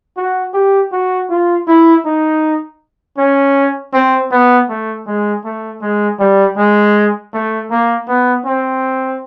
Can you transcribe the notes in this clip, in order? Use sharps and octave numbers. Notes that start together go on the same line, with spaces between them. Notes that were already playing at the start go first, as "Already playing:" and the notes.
F#4
G4
F#4
F4
E4
D#4
C#4
C4
B3
A3
G#3
A3
G#3
G3
G#3
A3
A#3
B3
C4